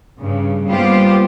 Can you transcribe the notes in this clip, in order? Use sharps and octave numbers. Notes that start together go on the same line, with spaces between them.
G2 C#3
G3 A#3 B3 F4 G4 C5